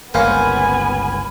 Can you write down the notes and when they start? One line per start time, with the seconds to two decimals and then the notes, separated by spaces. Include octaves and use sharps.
0.14 G1 C#2 A#3 B3 C#4 C5 G#5 B5